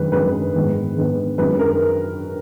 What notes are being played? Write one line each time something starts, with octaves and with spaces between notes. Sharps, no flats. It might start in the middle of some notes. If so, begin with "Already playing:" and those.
Already playing: F#2 D#3 G#3 C#4 B4
F#2 D#3 G#3 C#4 B4
G#2 D#3 G#3 B3
G#2 D#3 G#3 B3
F#2 D#3 G#3 C#4 B4
A#4